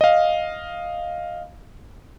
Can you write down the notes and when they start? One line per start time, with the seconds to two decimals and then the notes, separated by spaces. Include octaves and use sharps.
0.01 D#5 F5